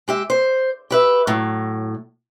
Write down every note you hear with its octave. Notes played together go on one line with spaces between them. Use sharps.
G#3 G4 E5
C5
G4 B4 E5
A2 F#3